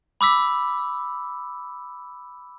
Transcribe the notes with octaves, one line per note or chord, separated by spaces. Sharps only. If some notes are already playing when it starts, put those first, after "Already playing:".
B5 D6 E6 B6